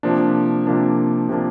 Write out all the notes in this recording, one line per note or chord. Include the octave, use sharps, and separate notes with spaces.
C3 F3 A#3 D4
C3 F3 A#3 D4
C3 F3 A#3 D4